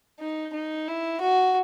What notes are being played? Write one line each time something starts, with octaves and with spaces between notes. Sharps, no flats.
D#4
D#4
E4
F#4